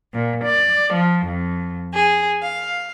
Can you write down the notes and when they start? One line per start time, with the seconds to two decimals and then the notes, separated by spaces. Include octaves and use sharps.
0.13 A#2
0.43 D5
0.92 F3
1.24 F2
1.93 G#4
2.41 F5